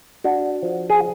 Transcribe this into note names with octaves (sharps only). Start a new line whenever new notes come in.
D4 F#4
F3
G#4